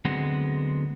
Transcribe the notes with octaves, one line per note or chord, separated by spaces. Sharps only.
D2 D3 F#3 G#3 B3 C4